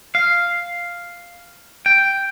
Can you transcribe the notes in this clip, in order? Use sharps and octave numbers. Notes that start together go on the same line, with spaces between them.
F5
G5